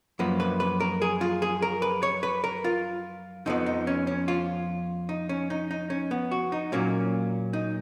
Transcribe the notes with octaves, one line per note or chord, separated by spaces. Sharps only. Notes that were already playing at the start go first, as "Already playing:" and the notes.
F#2 F3 A#3 B4
B4
B4
A#4
G#4
F4
G#4
A#4
B4
C#5
B4
A#4
F4
F2 F3 B3 D#4
D#4
C#4
C#4
F4
D#4
C#4
D#4
D#4
C#4
B3
F#4
D#4
A#2 F#3 A#3 C#4
D#4